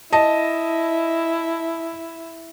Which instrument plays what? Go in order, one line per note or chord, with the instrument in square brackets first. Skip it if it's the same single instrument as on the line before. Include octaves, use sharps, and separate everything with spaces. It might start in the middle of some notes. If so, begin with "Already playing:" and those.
[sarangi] E4 [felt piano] D#5 A5